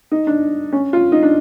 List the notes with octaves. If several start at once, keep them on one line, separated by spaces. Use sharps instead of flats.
D#4
D4
C#4
F4
D#4
D4